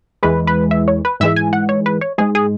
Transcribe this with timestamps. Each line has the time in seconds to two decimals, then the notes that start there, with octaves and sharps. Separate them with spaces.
0.23 E2 E3 G#3 B4
0.47 B4
0.71 E5
0.88 C#5
1.05 B4
1.20 G#2 E3 G#3 E5
1.36 G#5
1.53 F#5
1.69 C#5
1.86 B4
2.01 C#5
2.18 G#2 G#3 G#4
2.35 G#4